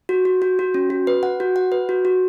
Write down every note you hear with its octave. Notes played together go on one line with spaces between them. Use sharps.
F#4
F#4
F#4
F#4
C#4
F#4
B4
F#5
F#4
F#5
B4
F#4
F#4